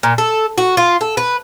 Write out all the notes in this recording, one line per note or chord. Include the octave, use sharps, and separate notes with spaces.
A#2
A4
F#4
F4
A4
B4